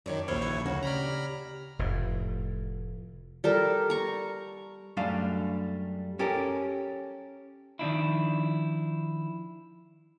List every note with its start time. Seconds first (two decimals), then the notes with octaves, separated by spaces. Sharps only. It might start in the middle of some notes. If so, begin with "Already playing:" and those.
0.06 F#2 D#3 D4 C#5
0.28 A#1 D#2 E4 F4 C5 C#5
0.42 E3 G#6
0.66 D2 C#3 F#4
0.83 G4 D5 A#5 B5 F6
1.79 F1 A2
3.44 G3 A4 A#4
3.90 A#5 C#6
4.97 F#2 G3 A3 D4 F5
6.19 C#4 G4 A4 A#4
7.79 D#3 F3 D4 E4